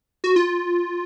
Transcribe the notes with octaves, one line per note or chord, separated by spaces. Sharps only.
F#4
F4